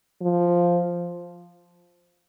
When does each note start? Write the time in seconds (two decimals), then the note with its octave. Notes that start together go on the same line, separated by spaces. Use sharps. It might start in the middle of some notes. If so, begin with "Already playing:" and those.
0.22 F3